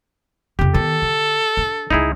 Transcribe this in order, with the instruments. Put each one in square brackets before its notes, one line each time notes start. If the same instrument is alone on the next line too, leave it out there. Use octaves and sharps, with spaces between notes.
[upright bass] F2 C#3 [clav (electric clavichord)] G4
[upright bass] D#3 B3 [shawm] A4
[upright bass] D3
D4
[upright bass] C#2 G#3 [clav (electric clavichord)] D#4 E4 G#4